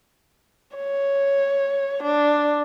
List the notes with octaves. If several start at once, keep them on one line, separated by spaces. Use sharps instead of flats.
C#5
D4